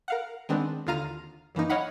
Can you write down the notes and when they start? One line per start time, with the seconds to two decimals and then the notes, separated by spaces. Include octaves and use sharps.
0.08 A#4 F5 F#5
0.49 D#3 G#3 B3 C4 D4
0.87 D#2 D3 F4 F5 A#5 D#7
1.55 F#2 E3 A#3 D#4
1.70 C#5 D#5 F5 F#5 B5